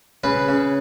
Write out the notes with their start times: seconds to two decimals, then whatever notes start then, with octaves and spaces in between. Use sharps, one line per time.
0.24 C#3 B4
0.48 C#3